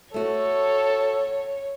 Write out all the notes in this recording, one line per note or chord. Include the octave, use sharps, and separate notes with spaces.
A3 F#4 A4 C#5